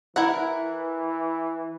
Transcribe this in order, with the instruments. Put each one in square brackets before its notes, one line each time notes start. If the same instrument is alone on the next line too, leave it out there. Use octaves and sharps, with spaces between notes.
[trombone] E3 [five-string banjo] E4 A#4 F#5